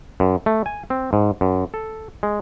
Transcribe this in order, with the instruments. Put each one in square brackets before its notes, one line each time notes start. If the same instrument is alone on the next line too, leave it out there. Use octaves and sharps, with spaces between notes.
[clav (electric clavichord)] F#2
A3
G#5
C4
G#2
F#2
A4
G#3